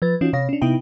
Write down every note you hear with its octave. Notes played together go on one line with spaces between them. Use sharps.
F3 B4 A6
E3 C#4 D#4 F4 F#4
C3 C#5 F5 A#6
C#4 D4
C3 B3 D#4 E4 G5